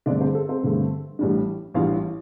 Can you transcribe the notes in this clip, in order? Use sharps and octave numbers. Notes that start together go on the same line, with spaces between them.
G2 D3 A3 C4 D4 D5
C4 C5
A4
C4 C5
G2 D3 A3 C4
A1 A2 G3 D4
A1 A2 G3 D4 F4 F5